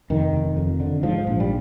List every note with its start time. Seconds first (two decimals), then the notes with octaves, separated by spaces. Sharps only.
0.10 F1 D#3
0.33 F1
0.57 F2
0.80 D3
1.03 G#2 F3
1.27 A#1
1.40 G3